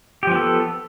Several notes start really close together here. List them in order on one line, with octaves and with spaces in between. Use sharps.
G4 F3 B3 A4